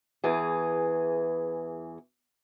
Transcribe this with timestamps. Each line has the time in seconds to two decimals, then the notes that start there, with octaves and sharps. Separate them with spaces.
0.24 E2 E3 G#4